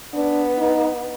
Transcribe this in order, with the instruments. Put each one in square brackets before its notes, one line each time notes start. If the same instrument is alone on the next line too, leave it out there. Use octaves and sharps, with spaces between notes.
[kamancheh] B3 [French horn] D4
[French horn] D#4